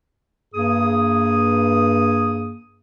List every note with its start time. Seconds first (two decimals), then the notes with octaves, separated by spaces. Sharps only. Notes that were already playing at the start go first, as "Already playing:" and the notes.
0.55 G2 A#3 G#4 D#6